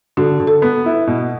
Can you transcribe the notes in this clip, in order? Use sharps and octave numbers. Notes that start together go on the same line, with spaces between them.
D3 F#4
D3
A4
B3
E4
B2